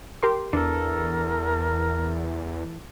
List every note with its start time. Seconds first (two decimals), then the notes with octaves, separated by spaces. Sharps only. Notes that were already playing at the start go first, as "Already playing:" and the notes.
0.23 G4 A#4 C6
0.53 E2 E3 D4 A4 A#4